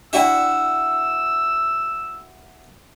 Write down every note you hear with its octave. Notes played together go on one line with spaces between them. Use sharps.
D4 E4 F#4 D5 E5 G5 E6